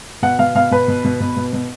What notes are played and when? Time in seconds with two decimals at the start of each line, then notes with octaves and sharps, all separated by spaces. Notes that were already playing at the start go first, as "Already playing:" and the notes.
0.22 B2 F#5
0.39 B2 F5
0.55 B2 F5
0.71 B2 B4
0.88 B2
1.04 B2
1.20 B2
1.37 B2
1.53 B2